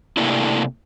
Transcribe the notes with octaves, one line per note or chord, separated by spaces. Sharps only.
C3 A3 A#3 D4 E4